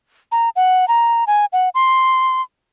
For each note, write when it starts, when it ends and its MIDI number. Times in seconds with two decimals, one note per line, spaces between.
0.32 0.49 82
0.56 0.88 78
0.88 1.24 82
1.27 1.45 80
1.53 1.69 78
1.75 2.42 84